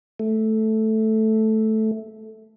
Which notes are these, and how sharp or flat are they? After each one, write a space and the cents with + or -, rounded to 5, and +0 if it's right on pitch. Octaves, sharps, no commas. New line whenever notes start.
A3 -5